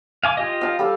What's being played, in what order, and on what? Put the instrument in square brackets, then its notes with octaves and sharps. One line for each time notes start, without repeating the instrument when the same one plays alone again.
[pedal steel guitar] F5 G#5 D6
F4 G4 D#5
[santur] F5 A5
G3 A4 F5